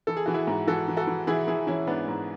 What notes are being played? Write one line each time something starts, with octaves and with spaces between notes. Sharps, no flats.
E3 A4
G#4
E3 F#4
E4 G#4
G#2
E3 F#4 A4
E3
F#4 A4
E3
E3 E4 G#4
E3 E4 G#4
E3 C#4 E4
G#2 B3 D4
G#2